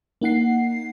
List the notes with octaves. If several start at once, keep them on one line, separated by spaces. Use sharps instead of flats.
A#3 D#4 F#5 C7